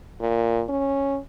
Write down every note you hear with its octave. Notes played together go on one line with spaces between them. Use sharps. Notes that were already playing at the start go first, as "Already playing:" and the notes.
A#2
C#4